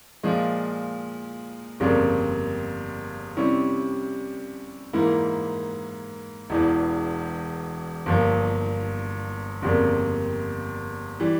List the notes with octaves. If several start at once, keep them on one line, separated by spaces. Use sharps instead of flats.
A#2 F3 G#3
G1 F2 C#3 G3 A#3
C3 G3 C#4 E4
G#2 E3 A#3 E4
E1 E2 E3
G1 G2 F3 A#3
G1 F2 C#3 G3 A#3
E3 G3